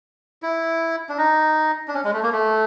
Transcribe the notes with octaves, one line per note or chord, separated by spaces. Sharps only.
E4
D4
D#4
D4
C#4
G#3
A3
A#3
A3